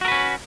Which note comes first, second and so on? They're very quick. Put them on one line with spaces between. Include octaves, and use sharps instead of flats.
F#4 A#4 B4 C#4